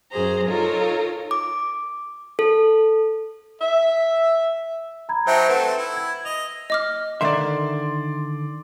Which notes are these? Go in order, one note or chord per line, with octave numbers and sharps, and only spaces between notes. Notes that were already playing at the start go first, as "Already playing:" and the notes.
F#2 G#4 C5 A#5
D#4 F4 A4 A#4 C#5
D6
A4
E5
A#5 B5 G#6
F#3 D#4 C5 E5 G5 A5
A3 C4 B4 F#5
E4
G#6
D#5 F7
D#5 D6 F6
D3 D#3 D5 E5 C6